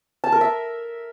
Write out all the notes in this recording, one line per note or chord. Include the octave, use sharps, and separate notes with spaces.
A5
A#4
E5